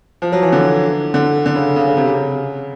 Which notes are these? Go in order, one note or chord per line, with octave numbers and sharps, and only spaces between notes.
F3
F#3
E3
D3
D3
D3
C#3
C#3
C#3
C3
C#3